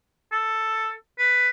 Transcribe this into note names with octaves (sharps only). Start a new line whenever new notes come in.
A4
B4